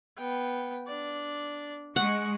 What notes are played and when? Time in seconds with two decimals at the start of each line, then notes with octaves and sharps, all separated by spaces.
0.18 B3 G5
0.87 D4 D5
1.96 G#3 F#5 C#6